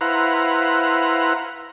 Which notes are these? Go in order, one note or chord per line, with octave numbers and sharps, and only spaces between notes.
E4 B4 C5 F5 F#5 A#5